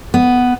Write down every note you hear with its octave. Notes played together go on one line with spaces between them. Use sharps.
B3